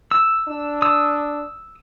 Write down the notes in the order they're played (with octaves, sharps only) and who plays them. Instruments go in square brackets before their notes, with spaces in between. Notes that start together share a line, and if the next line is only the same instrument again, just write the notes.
[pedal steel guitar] E6
[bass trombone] D4
[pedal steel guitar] D#6 E6